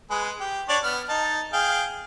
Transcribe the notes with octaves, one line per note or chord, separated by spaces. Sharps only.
G#3 G#4 B4
G4
D4 C#5 D5
B3 F6
D#4 A5
G#4 F5 G5